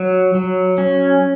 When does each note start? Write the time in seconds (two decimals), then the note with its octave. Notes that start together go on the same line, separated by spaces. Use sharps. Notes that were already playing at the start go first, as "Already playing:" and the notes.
Already playing: F#3
0.35 F#3
0.78 C#4